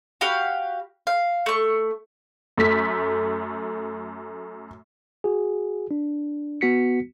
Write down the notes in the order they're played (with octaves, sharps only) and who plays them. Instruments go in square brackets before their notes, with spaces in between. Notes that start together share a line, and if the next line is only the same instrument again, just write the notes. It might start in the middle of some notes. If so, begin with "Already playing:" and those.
[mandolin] F#4 G4 F5 B5
F5
A3 C#6
[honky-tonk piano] F#2 A3 B6
[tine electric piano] F#4 G#4
D4
B3 F#4 B6 C#7